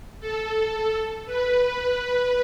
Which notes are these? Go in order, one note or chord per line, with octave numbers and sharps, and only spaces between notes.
A4
B4